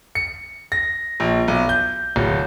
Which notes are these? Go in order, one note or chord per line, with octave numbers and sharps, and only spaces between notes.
C#7
A#6
A#1
B1
G6
D1